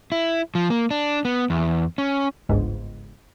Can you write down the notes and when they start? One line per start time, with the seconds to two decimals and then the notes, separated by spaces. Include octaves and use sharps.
0.12 E4
0.55 F3
0.70 A#3
0.91 D4
1.25 B3
1.50 E2
1.98 C#4
2.49 G1 C#2 G#2